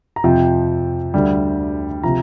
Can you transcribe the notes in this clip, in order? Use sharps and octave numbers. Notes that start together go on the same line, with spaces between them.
A#5
F2 C3 F3 G5
D2 D3 G3
C3 F3 A#5